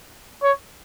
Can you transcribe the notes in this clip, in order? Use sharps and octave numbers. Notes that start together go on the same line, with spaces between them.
C#5